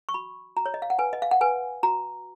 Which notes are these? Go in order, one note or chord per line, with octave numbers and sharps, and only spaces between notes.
C#6
F#4 B5
F#4 A#5
C#5
D#5
F5
F#5
B4 G#5
D#5
F5
F#5
B4 G#5
F#4 A#5